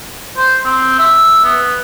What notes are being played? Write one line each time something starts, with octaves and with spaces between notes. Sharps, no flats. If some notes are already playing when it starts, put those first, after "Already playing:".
C5
C4
E5
B3